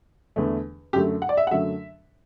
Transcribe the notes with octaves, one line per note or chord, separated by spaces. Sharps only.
E2 D3 A3
F#2 D3 F#3 A3 G4
F#5
D5
E5
F#5
F#2 D3 F#3 A3 E5